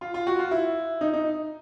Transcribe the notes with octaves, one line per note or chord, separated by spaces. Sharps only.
F4
F4
F#4
F4
E4
D#4
D#4